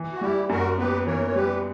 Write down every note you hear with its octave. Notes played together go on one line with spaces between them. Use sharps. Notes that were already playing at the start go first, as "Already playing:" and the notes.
Already playing: E3
F#4
G3 E4 G4
F#2 F#4 A#4
B3 G4 B4
E3 A#4 C#5
C#5
G3 G4 B4